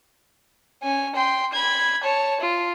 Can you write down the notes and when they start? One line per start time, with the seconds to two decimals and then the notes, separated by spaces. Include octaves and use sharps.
0.83 C#4 G#5
1.15 G5 C6
1.52 B5 G#6
2.04 C#5 A5
2.40 F4